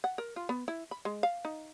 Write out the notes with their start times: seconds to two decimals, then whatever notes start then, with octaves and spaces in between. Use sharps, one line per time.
0.04 F#5
0.18 A#4
0.36 F4
0.49 B3
0.68 E4
0.91 B5
1.05 G#3
1.23 F5
1.45 D#4